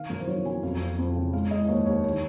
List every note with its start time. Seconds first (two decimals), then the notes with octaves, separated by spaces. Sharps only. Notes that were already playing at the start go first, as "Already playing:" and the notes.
Already playing: D#3 F5
0.10 F#2 A#4
0.20 C5
0.27 F#3 C#5
0.45 F#3 G#5
0.63 F2 F5
0.80 F2 F5
0.98 F2
1.15 C#3
1.33 G#3 F5
1.51 G#3 D#5
1.69 D#2 C#5
1.86 D#2 C#5
2.03 D#3 C#5